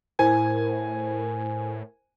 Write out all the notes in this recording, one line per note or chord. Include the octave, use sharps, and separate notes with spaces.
A2 E4 A#4 C5 G#5 G#6